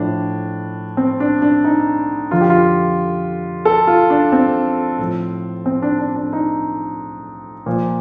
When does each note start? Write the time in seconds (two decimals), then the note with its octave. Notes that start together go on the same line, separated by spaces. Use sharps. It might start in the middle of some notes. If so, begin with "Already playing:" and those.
Already playing: A2 F3 D4
0.97 C4
1.20 D4
1.42 D4
1.64 D#4
2.31 F2 D3 F3 F4
2.41 G4
2.50 F4
3.65 A4
3.87 F4
4.10 D4
4.32 C4
4.99 A2 F3
5.66 C4
5.82 D4
5.99 D4
6.16 D4
6.33 D#4
7.66 A#2 F3